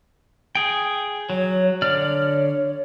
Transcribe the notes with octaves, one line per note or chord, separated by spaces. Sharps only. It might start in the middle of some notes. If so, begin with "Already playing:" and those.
G#4 G5
F#3 C#5
D3 C#5 D5 F6